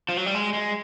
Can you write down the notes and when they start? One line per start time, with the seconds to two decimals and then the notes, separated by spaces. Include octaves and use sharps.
0.09 F3
0.17 F#3
0.26 G3
0.35 G#3
0.53 G#3